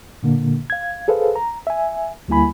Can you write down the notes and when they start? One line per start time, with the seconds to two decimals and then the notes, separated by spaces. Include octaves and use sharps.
0.23 A#2 D3 A#3
0.70 F5 G#6
1.08 G#4 A4 B4 C5 F5
1.36 A#5
1.67 E5 G#5
2.28 D2 G3 A#3 E4 G#5 B5